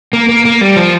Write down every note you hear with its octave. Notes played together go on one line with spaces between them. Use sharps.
A#3
A#3
A#3
G3
F3